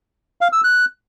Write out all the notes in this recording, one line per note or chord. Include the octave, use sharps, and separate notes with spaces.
F5
E6
F#6